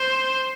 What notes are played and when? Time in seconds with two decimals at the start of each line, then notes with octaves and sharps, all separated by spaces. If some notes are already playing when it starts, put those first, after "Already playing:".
Already playing: C5